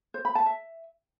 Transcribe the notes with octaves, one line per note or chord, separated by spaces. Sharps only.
C5
B5
A5
E5